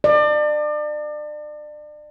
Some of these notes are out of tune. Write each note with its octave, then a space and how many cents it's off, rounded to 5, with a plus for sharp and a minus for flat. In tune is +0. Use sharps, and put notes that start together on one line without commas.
D5 +35